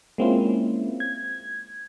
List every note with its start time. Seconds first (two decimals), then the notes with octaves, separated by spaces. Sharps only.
0.18 G#3 A#3 C4 C#4 E4 F4
1.00 G#6